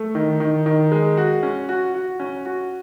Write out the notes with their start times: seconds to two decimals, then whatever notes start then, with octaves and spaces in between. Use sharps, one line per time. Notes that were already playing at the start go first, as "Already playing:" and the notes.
Already playing: A3
0.15 D#3
0.40 D#3
0.66 D#3
0.92 G#3
1.17 F#4
1.43 C#4
1.69 F#4
1.94 F#4
2.20 C#4
2.46 F#4